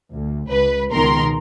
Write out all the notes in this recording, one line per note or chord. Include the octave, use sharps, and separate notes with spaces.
D2
C#2 B4
C#2 B2 D#3 A#4 A#5 C6